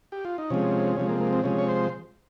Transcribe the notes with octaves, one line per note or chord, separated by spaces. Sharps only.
G4
F4
D#4
C3 F3 G#3 C#4
C3 F3 G#3 C#4
A#3
A#3
C4
C3 F3 G#3 C#4
C#5
C5